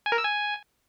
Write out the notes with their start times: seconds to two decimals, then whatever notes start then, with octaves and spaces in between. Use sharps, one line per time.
0.06 G#5
0.12 A#4
0.18 E6
0.24 G#5